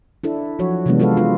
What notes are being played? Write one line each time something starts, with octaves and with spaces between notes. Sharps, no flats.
D4 E4 A4
F3 F#3 F#4 C#5
C3 E3 F#3 G#3 B3 D4
F4 F#4 A4 B4 F5
D4 F4 A4 B4